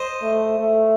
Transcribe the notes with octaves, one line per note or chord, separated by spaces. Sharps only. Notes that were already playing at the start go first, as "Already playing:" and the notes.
Already playing: C5 D#5
A3
A3